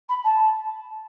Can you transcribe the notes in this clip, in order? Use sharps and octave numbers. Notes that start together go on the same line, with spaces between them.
B5
A5